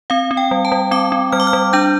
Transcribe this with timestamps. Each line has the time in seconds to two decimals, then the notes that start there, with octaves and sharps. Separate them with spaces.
0.10 C4 F5
0.31 C4
0.37 G5
0.51 G3
0.65 A5
0.72 G3
0.91 C4 D6
1.12 C4
1.32 G3 F6
1.40 D6
1.47 F6
1.53 G3
1.73 D4 G6